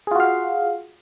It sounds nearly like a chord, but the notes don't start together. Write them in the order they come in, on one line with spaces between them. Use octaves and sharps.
G#4 F4 F#4 F5